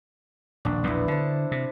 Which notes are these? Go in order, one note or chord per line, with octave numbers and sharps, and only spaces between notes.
D#1 A#1 D4
A#1 E2 B2 B3 E4
D3 C5 A5
C3